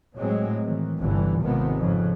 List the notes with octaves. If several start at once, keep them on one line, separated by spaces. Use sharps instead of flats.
A2 F#3 G#3 C4
D#3 E3
G1 C2 D3 E3 G3
G#1 C3 D#3 F3 G#3 B3
F2 G#2 C#3